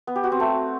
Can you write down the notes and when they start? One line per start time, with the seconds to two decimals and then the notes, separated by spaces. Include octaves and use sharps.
0.07 B3
0.16 G4
0.24 F#4
0.32 C4
0.40 A3